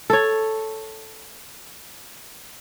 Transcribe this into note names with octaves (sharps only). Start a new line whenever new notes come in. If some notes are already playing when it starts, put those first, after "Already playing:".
A4 C#5